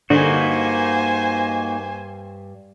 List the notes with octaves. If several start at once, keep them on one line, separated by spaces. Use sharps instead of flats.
G2 D3 A#3 D#4 F#4 C5 G#5